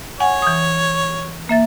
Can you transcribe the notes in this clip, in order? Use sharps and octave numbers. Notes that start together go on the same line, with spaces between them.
C#5 F#5 G#5
E3 D#6
A#3 E5 A6